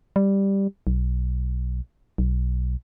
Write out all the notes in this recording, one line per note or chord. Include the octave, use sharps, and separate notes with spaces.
G3
B1
B1